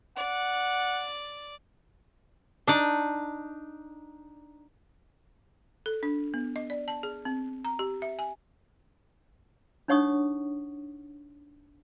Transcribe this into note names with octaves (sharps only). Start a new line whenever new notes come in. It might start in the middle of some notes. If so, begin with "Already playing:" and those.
D5 F#5
D4 D#4 D5
A4
D4
B3
D#5
D5
A5
G#4
C4
A#5
G4
E5
G#5
D4 D#4 C#5 F#5 C#6 D#6